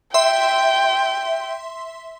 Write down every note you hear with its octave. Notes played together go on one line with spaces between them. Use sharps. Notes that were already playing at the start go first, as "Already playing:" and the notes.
E5 G5 C6